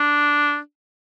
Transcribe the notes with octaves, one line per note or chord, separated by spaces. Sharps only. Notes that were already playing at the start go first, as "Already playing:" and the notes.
Already playing: D4